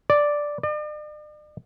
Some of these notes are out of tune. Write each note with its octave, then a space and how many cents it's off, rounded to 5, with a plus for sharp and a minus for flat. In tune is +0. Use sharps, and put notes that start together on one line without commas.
D5 +0
D5 +45